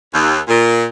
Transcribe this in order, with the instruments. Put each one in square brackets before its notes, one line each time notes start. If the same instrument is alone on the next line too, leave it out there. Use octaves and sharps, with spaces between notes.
[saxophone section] D#2
A#2